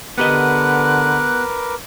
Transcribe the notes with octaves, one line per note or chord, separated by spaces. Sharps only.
D3 B3 G4 A#4 B4 D#5 D6 F#6